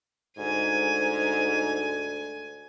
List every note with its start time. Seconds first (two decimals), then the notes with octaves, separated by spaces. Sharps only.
0.38 D2 G#2 G#5